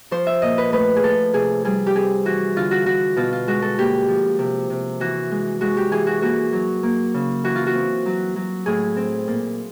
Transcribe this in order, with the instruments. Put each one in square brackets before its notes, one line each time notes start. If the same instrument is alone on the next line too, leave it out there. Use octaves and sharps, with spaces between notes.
[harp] F3 C5
E5
A#2 D#5
B4
A3 B4
G#4
F3 A4
C3 G#4
G3 G#4
G4
C4 G#4
E3 F#4
D3 F4
F#4
D3 F#4
B2 F4
F4
G#3 F#4
A4
A#3 G4
F3
C3
C3
E3 F#4
G#3
G#3 F#4
G4
E3 G#4
F#4
A#3 F#4
F#3
A#3
C#3
E3 F#4
F4
F#4
C4
F#3
F#3
A2 G#4
C4
A#2